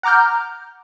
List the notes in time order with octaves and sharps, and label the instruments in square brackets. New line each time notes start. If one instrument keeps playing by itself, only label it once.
[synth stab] F#5 A#5 D6 F6 G6